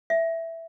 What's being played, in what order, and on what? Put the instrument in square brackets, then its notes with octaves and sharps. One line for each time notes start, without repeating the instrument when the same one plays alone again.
[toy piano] E5